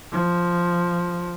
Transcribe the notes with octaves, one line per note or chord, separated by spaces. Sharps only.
F3